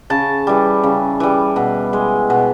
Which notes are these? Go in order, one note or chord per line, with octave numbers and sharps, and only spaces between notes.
C#3 A5
E3 G3
C#3
E3 G3
B2
G#3
B2